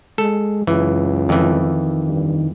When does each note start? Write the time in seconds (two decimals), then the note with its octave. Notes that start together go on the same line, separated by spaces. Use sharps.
0.18 G#3 A4
0.67 C#2 F#2 E3
1.29 F2 D#3 E3
2.08 G2